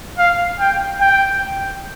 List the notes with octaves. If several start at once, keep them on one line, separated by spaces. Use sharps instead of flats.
F5
G5
G5